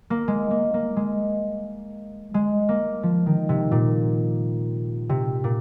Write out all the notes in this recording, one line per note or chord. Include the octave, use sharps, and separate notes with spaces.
A#3
G#3
A#3
A#3
G#3
G#3
A#3
F3
D#3
C3
A#2
C3
A#2